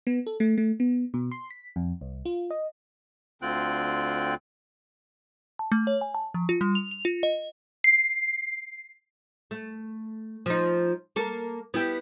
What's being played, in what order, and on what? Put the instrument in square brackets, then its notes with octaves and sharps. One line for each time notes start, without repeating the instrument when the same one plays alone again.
[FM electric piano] B3
A4
A3
A3
B3
B2
C6
B6
F2
C2
F4
D#5
[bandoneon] D2 D3 C4 F4 G5 F#6
[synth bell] A5
A3
C#5
G#5
A5
F3
F4
G3
F7
F7
F4
D#5
[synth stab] C7
[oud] A3
F3 D#4
A#3 A4
B3 E4 G4